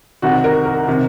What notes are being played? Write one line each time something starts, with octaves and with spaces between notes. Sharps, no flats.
C2 C3 D#3 F#4
A#4
A#4
C3 D#3